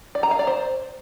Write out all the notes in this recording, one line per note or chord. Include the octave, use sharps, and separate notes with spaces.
D5
A#5
F5
D5
C5